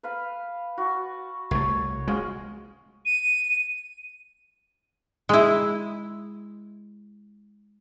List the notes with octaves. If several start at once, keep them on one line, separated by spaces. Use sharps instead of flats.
B4 F5 B5
F#4 A5
C2 A3 C#5
G#3 C#4 F4 F#4
D#7
G#3 E4